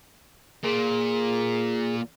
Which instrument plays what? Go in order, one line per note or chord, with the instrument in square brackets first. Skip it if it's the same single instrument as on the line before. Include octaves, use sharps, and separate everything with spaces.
[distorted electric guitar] A#2 [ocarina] G#4